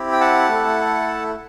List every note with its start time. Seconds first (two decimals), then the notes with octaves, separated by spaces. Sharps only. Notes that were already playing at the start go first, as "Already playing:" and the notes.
Already playing: C4 E4 G4
0.12 G5
0.20 F#5 A5
0.49 A3 E4 A4